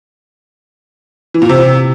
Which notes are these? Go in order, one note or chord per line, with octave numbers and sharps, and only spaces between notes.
E3
A#2
C3